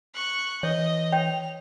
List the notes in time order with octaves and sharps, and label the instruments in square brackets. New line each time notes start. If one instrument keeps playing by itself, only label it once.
[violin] C#6 F#6
[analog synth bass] E3 [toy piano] C#5 [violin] D#5
[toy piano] C#5 G5 [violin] F7